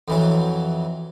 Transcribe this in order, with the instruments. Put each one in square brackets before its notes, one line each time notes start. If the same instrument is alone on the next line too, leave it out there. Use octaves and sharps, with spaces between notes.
[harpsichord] F2 E3 F#3